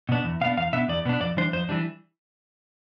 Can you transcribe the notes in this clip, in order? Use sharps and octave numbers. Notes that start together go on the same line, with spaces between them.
B2 B3 D4
E2
B2 B3 D4 F5
E2 F5
B2 B3 D4 E5
E2 D5
B2 B3 D4
F2 D5
E3 G3 D4 C5
F2 C5
E3 G3 D4